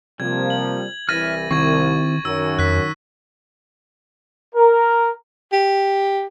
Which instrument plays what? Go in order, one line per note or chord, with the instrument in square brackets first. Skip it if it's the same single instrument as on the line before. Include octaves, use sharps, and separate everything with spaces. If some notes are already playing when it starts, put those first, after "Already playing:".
[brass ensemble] C3 F3 A#3 [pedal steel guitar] G3 [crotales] G#6
[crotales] F#7
[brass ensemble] C2 E3 [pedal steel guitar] C#5 E5 F6 [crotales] A6 A#6 D#7
[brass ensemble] C2 [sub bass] D#3 [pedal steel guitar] C4 E4 G4 [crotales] C#6 G#6
[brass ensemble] F#2 [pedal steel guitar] D#3 [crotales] E6
[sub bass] F2 [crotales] F#6 B6
[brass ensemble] A#4
[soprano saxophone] G4